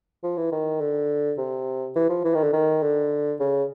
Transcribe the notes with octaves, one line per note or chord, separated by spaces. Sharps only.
F3
E3
D#3
D3
C3
E3
F3
E3
D#3
D3
D#3
D3
C#3